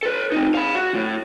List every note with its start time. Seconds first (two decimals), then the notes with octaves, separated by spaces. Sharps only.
0.03 A4 B4
0.32 C4 D#4
0.55 F5 B5
0.75 F#4
0.95 A2